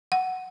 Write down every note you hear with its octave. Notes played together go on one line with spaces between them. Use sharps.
F#5